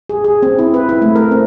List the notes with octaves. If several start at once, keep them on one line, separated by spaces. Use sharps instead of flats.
G#4
G#4
C4
E4
B4
E4
A3
A#4
C4